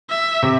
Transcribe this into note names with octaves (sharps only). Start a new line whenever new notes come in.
E5
C3